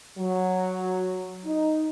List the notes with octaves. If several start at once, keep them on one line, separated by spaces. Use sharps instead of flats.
F#3
D#4